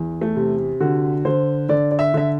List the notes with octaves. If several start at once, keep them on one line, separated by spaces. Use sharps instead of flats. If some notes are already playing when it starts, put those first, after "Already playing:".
Already playing: E2
A3
C3
D3 F#4
D3 C5
D3 D5
D5
E5
D3 E5